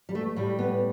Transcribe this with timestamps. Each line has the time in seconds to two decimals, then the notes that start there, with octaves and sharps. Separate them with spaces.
0.09 G3
0.15 A3
0.36 A2 G3
0.59 B3